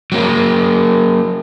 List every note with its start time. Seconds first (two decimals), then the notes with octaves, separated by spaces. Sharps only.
0.12 F#3 A#3 A#4